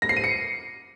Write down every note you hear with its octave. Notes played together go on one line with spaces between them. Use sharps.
A#6
C7
D#7
C#7